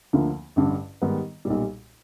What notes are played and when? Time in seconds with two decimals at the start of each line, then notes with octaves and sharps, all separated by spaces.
0.13 D2 D3 F3 A#3
0.56 A1 G2 D3
1.02 G#2 D#3 G3 B3
1.45 B1 A#2 G3